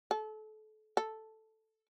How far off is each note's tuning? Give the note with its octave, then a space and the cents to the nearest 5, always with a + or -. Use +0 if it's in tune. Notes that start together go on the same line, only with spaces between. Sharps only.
A4 -30
A4 +0